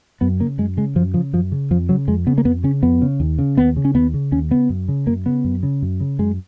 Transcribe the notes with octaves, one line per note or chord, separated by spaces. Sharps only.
F#2 B3
C#3 A#3
F#2 G#3
C#3 G#3
F#2 F3
C#3 F3
F#2 F3
C#3
F2 F3
C#3 F#3
F2 G#3
C#3 B3
A#3
F2 B3
C#3 C#4
F2 B3
C#3
D#2
C#3
D#2 B3
C#3
C#4
D#2 B3
C#3
D#2 C#4
C#3 B3
F#2
C#3
F#2 A#3
C#3 B3
F#2
C#3
F#2
C#3
F#2 G#3